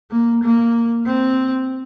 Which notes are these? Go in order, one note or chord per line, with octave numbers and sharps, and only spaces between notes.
A#3
A#3
C4